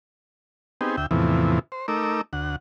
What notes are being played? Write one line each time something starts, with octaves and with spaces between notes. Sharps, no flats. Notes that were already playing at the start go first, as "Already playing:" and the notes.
B3 C4 D#4 G4 G#4
D2 E5 G5
E2 A2 C3 E3 F3 B3
C5
A3 D#4 A#4 D6 E6
D2 F#5